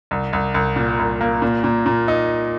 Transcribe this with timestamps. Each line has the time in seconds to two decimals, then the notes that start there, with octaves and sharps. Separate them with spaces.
0.11 C2
0.33 C2
0.54 C2
0.76 A#2
0.99 C2
1.21 A#3
1.42 A#2
1.64 A#2
1.86 A#2
2.08 D#4